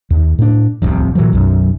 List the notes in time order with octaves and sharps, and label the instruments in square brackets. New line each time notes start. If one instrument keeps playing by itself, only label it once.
[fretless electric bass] D#2
A2 D4
D1 C2 F2 C3
A#2 E3 F#3
B1 F#2